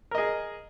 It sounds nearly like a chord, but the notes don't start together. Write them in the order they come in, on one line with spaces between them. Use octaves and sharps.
A#4 D#5 G#4